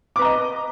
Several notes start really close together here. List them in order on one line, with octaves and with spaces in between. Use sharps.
D6 B4 A#5 D#5